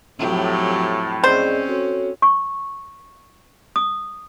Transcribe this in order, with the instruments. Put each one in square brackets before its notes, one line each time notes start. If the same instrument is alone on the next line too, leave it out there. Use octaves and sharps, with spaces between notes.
[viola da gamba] F2 F#3 G4 [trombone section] A2
[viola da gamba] C4 C#4 [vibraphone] G#4 D5 D#5 [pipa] C5
[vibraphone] F#4 A4 C#5
[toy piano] C#6
D#6